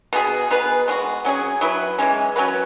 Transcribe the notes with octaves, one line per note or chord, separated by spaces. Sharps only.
B2 B3 G#4
B2 B3 G#4 B4
G#3 C#4 F#4
F#3 C#4 G#4
F#3 E4 B4
E3 G#3 C#4
F#3 C#4 F#4 B4